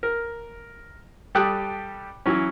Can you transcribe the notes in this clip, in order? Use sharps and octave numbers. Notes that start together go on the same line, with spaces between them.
A#4
G3 G4 A4 G5 D#6 F#6
E3 F#3 C#4